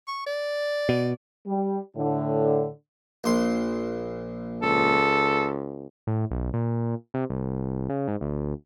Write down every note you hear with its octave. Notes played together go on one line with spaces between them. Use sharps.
C#6
D5
B2
G3
A2 D3
A#1 C6
C#2 A4
A2
B1
A#2
C3
C2
C#3
G#2
D2